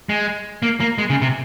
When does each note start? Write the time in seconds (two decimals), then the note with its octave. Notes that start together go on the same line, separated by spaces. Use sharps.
0.09 G#3
0.63 A#3
0.80 A#3
0.98 G#3
1.10 C#3
1.22 C3